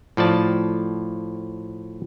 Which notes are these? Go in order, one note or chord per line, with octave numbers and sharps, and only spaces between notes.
A2 F3 D5 A5